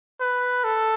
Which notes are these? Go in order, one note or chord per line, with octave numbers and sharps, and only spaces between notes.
B4
A4